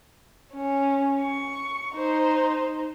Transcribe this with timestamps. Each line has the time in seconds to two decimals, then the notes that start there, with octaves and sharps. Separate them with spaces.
0.53 C#4
1.22 C#6
1.95 D#4 C5